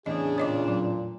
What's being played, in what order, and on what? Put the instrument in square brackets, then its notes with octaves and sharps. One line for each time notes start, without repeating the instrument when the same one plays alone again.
[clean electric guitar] E2 A2 E3 [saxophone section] C#3 C#4 D4 [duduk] G#4 [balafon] D#5
[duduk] A#2 [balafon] C#5 D#5 D6
[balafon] F#3